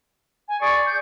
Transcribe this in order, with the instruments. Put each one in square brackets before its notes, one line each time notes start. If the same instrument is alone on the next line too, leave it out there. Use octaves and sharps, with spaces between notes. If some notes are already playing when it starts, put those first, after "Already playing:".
[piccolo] G#5
[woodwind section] G#4 D5 C#6 [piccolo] G#5
[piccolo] G6